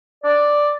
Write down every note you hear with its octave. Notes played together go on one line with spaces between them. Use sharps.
D5